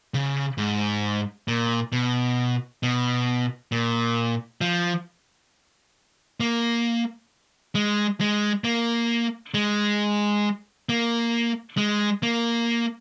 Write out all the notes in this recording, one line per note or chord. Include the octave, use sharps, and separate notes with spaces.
C#3
G#2
A#2
B2
B2
A#2
F3
A#3
G#3
G#3
A#3
G#3
A#3
G#3
A#3